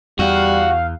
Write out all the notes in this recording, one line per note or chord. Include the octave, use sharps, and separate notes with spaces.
E2 G3 F#4 F5